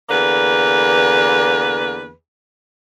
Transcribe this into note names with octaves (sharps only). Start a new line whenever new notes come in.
E2 D3 A#3 B4